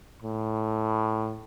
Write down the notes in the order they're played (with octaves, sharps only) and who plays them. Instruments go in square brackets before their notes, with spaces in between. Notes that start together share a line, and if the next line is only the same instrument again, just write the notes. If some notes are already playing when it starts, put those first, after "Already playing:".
[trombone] A2